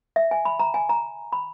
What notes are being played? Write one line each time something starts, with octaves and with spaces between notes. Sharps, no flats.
E5
G#5
B5
A#5
G#5
A#5
B5